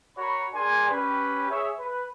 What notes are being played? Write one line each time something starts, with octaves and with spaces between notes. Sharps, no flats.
F#4 A#4 C#5 B5
D4 G#4 A#4 D5 G#5 C6
C#4 G4 B4
G#4 C#5 E5
B4